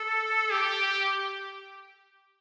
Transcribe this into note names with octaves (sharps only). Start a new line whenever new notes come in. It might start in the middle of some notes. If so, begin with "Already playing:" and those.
Already playing: A4
G4